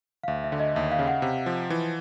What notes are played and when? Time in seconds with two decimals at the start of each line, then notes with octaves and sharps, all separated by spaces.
0.23 F5
0.28 D2 E5
0.44 E5
0.52 D3
0.60 D#5
0.75 D#2 E5
0.92 F5
0.99 C#3
1.08 F#5
1.22 C3
1.46 F3
1.70 E3